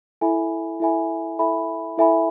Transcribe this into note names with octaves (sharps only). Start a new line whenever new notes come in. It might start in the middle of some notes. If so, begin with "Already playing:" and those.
E4 A4 E5 G#5 B5
E4 A4 E5 G#5 B5
E4 A4 E5 G#5 B5
E4 A4 E5 G#5 B5